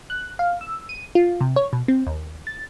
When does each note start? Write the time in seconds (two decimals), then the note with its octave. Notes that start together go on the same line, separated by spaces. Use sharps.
0.10 F#6
0.39 F5
0.61 E6
0.89 D#7
1.15 F4
1.41 C3
1.56 C#5
1.73 B2
1.88 C4
2.07 D#2
2.47 A6